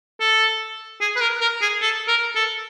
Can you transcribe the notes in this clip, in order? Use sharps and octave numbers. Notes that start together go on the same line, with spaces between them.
A4
G#4
B4
A#4
A#4
G#4
A4
A#4
A4